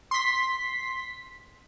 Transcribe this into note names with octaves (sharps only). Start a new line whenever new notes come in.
C6 B6